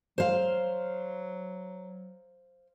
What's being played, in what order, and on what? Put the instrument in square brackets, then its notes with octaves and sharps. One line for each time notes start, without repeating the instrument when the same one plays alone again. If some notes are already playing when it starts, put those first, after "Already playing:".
[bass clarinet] F#3 [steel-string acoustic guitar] C5 F5